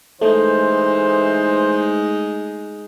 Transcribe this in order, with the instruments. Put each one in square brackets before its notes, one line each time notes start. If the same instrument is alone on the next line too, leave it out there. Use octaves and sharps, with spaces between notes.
[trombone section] E3 B4 C5 [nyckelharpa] G#3 D#4 [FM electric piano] A3